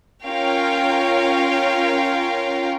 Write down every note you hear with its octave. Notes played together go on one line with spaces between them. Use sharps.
C#4 F4 A#4 C#5 F5 G5